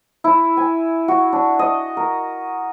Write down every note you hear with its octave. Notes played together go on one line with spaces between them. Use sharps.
E4
G#5
F#4
D4
D#5
A#4